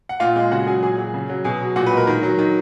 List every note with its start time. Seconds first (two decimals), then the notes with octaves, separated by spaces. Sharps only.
0.09 F#5
0.20 A#2 F4 F5
0.36 G#3
0.51 C#3 F#4 F#5
0.67 F#3 G#4 G#5
0.83 A#2 G#4 G#5
0.98 F#3
1.14 C#3
1.29 F#3
1.44 B2 G#4 G#5
1.61 F#3
1.76 A#2 F#4 F#5
1.86 B4
1.92 G#3
1.97 A#4
2.07 D#3 A#4
2.23 F#3
2.39 D#3